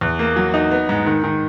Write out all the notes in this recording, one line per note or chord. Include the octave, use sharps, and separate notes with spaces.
E2
A#3
F#3
D#4
B3
G#2
D#3
D#3